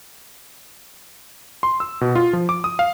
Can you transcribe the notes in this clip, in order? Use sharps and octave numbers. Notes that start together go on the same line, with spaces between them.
C6
E6
B2
F4
F3
D6
D#6
F5